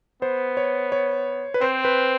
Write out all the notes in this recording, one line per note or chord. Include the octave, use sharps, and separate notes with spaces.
B3 C5
C#5
C#5
B4
C4 C5
B4